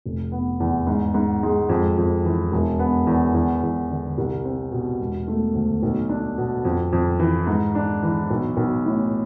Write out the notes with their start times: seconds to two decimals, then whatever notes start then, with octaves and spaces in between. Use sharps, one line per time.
0.06 F1
0.32 B3
0.60 E2
0.87 G#2
1.14 G#2
1.43 G#3
1.69 F2
1.98 F2
2.25 E3
2.52 E1
2.79 B3
3.07 E2
3.34 E2
3.63 E2
3.90 D3
4.18 C2
4.45 C4
4.72 B2
5.00 E1
5.28 A3
5.54 D2
5.83 B1
6.09 D4
6.38 B2
6.65 F2
6.93 F2
7.19 E3
7.47 G#2
7.75 D4
8.03 E3
8.31 B1
8.57 B1
8.85 A2